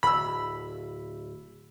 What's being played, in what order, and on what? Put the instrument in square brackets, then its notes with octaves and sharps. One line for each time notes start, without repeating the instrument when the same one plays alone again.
[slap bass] D1 [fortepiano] B5 E6